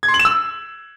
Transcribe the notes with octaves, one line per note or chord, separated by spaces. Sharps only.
G#6
C6
F#7
E7
E6